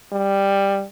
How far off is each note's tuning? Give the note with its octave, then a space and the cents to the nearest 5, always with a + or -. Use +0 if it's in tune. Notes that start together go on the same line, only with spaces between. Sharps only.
G3 +10